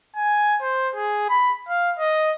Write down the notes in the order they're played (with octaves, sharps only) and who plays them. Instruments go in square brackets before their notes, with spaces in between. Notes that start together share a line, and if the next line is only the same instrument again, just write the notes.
[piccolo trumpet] G#5
C5
G#4
B5
F5
D#5